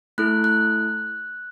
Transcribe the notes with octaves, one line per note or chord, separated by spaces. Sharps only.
A3 E4 A4 F#6
F#6